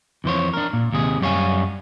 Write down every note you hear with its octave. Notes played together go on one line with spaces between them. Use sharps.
F2 E3 C5 C#5
D4 A#4
A#2
D#2 C3 G#4
F#2 G3 C#5 F5 G#5